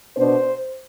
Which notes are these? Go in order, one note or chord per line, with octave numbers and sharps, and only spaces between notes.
B2 B3 D4 C5